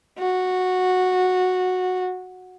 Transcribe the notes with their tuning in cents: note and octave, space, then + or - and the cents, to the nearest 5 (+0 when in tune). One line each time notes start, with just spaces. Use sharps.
F#4 -10